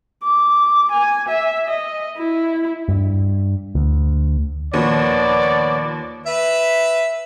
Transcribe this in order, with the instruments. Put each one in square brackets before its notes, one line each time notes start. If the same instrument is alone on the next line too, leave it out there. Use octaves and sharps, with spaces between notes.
[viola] D6
G#5
E5
D#5
E4
[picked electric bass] G2
D2
[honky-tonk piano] D#2 [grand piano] A#2 F3 [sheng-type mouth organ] B3 C#5 [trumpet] D5
[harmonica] B4 E5